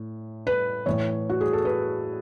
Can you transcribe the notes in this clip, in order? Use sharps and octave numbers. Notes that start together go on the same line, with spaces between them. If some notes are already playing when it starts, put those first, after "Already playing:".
Already playing: A2
B4
A2 E3 C#5
F#4
G#4
A4
B4